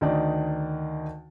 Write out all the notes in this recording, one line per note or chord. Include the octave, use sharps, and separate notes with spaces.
D2 D#3 D#4 D5